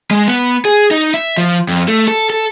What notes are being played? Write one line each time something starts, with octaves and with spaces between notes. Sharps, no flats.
G#3
B3
G#4
D#4
E5
F3
F2
A3
A4
A4